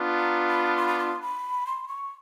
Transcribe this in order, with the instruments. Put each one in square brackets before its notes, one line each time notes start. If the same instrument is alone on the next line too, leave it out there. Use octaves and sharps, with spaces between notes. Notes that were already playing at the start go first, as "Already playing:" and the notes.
Already playing: [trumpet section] B3 D4 F4
[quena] A#5
B5
C6
B5
C6
B5
C6
C#6